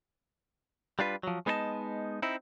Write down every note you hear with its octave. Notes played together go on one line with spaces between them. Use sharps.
G3 D4 F4 B4
F3 F#3
G#3 B3 D#4 B4 D#5 A5
C4 D#4 E4